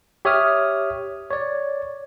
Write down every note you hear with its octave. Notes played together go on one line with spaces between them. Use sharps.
G4 C#5 E5 D#6 F6
C#5 D5